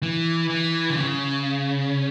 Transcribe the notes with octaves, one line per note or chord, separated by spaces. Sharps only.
E3
E3
D3
C#3